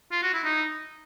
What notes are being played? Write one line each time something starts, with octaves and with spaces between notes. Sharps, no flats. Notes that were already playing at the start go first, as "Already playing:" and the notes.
F4
F#4
E4
D#4